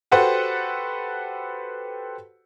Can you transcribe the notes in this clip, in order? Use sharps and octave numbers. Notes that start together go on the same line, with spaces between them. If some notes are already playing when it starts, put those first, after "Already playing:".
F#4 G4 A4 B4 C5 F#5